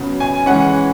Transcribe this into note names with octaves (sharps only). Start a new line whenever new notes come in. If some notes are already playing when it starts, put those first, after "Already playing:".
Already playing: C#3 F#3 B3
G#5
E3 G#3 C#4 F#5